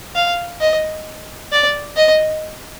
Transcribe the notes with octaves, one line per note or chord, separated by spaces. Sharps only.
F5
D#5
D5
D#5